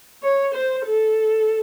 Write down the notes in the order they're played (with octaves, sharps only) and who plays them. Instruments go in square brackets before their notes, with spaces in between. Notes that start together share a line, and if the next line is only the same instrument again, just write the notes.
[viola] C#5
C5
A4